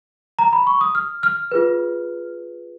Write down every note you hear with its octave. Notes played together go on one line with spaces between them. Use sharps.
A#5
B5
C#6
D#6
F6
F6
F4 G#4 B4